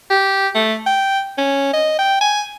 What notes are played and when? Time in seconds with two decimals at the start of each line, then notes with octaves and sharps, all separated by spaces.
0.10 G4
0.55 A3
0.86 G5
1.38 C#4
1.73 D#5
1.99 G5
2.21 G#5